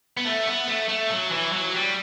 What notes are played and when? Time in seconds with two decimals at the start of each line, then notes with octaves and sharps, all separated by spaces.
0.17 B3
0.25 A3
0.47 B3
0.68 A3
0.89 A3
1.10 F#3
1.32 E3
1.53 F#3
1.74 G3